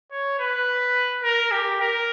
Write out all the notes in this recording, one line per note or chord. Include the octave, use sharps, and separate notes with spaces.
C#5
B4
A#4
G4
A#4